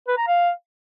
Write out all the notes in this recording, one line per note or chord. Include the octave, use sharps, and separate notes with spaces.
B4
A#5
F5